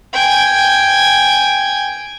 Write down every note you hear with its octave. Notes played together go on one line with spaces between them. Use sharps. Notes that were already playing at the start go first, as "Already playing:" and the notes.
G5 G#5